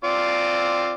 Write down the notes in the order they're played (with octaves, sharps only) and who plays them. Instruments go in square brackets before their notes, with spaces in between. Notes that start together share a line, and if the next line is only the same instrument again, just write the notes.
[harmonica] C4 F4 D5